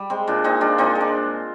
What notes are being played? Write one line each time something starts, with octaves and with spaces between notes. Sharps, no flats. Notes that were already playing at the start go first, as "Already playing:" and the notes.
Already playing: G3
G#3 C4
A#2 D4
A#2 C4 D#4
G#3 D4 F4
A#2 C4 D#4
G#3
D4